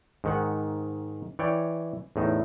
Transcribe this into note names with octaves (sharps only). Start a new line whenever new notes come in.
G#2 D#3 F#5
E3 C#5 D5 G5
E2 A2 D#4